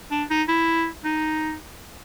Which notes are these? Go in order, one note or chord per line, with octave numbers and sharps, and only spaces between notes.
D4
D#4
E4
D#4